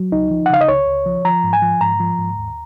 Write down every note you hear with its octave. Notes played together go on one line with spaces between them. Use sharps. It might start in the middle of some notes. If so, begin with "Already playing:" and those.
Already playing: F#3
C#2 D#4
F3
F#5
C#3 F5
D#5
C#2 C#5
C#2
F3
F3 A#5
G#2
G#5
F3
G#2 A#5
F3
G#2
D#2